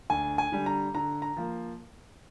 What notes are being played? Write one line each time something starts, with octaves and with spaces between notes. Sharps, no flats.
D2 G#5
G#5
D3 G3
A#5
D3 A#5
A#5
F3 A#3